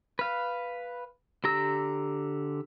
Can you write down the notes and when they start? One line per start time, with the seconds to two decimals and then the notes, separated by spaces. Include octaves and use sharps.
0.19 B4 F5
1.44 D3 G4 A#5 E6